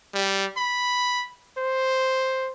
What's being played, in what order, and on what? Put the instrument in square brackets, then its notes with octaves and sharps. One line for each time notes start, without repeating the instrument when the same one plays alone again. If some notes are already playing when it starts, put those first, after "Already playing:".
[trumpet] G3
B5
C5